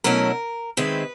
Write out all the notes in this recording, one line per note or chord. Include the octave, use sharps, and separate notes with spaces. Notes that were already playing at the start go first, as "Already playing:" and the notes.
B2 F#3 A3 C#4 E4 A#4
D#3 G#3 C4 E4 B4